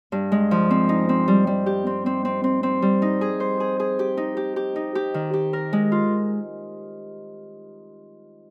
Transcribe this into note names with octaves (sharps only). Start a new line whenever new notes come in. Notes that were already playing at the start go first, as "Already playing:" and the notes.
G2
G#3
F3
C4
D#4
C4
G3
G3
G4
C4
C4
C4
C4
C4
G3
D#4
G#4
C5
G#4
G#4
G4
D#4
G4
G4
D#4
G4
D#3
G4
A#4
G#3
F4